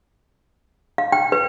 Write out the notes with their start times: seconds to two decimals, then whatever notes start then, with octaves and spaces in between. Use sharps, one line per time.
0.98 F5
1.12 G5
1.32 B4